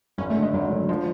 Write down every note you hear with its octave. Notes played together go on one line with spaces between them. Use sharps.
G#1 C#4
A3
D3
G#3
G#1 F#3
D3
F3 G#3